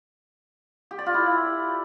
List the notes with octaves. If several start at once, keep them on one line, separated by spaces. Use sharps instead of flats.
G4
D5
F4
E4